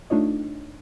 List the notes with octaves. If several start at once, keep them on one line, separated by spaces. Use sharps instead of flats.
A3 D4 D#4 F4 C#5 D#5